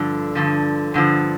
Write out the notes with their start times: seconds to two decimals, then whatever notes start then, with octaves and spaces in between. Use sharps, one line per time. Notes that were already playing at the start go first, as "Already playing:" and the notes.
Already playing: G2 D3 F3
0.35 G2 D3 F3
0.94 G2 D3 F3